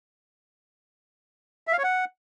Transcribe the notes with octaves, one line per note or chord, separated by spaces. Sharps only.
E5
F5
C#5
F#5